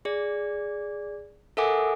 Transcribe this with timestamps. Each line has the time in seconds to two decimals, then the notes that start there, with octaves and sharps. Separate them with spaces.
0.05 G#4 D5
1.57 A4 A#4 E5 F#5 G#5 D6